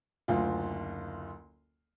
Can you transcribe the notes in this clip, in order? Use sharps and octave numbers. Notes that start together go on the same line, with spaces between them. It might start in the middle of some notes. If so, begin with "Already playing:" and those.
F#1 D2 F4